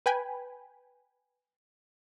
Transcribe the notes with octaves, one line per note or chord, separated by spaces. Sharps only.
B4 G5 G#5 B5